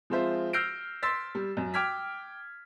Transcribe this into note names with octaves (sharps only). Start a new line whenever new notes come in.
F3 G#3 C4 F4 C5 E5
E6 F6 G6 A#6 C7 D7
C6 E6 A6 B6
G3
F#2
G5 D6 F6 G#6 B6